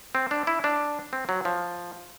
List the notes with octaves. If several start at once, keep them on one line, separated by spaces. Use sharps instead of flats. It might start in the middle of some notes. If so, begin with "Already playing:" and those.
C4
D4
E4
D4
C4
F#3
F3